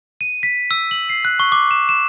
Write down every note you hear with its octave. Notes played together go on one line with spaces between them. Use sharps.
D#7
B6
E6
F#7
C7
F#6
C#6
D6
E7
E7